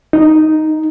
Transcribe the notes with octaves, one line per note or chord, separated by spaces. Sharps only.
D#4